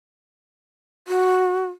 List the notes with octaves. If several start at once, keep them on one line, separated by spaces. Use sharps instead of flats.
F#4